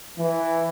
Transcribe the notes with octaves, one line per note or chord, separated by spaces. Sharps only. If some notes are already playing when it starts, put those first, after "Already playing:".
E3